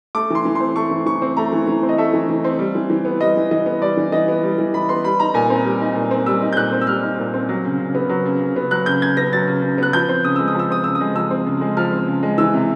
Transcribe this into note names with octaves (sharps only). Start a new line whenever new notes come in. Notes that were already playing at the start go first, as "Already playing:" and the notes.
A3 D6
E3 C6
E3
C6
C4
A3 C#6
E3
E3 C#6
C4
A3 A#5
E3
E3
C4
D#5
A3 E5
E3
E3
C4
G3
E3
E3
B3
G3 D#5
E3
E3 D#5
B3
G3 D5
E3
E3 D#5
B3
G3
E3
E3 B5
B3 C6
G3 B5
D#4 A#5
A#2 G#5
C4
G3
D#4
A#2
C4
G3 E6
D#4
G6
A#2 F#6
C4
E6
G3 F6
D#4
A#2
C4
F#3
C#3
C#3
B3
F#3
C#3
C#3
B3
F#3 F#6
C#3 G6
C#3 G#6
B3 A#6
F#3 A6
C#3
C#3
B3 F#6
F3 G6
C4
C#3 D#6
G#3 E6
D#6
F3 E6
C4 D#6
C#3 E6
D#6
G#3
F3 E6
C4
C#3
G#3
F3 F6
C4
C#3
G#3
E3 E6
C3